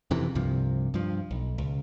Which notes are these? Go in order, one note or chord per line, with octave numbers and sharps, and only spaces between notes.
F2 C3 E3
C2 G2 C3 F3
G2 F3
B1
C#2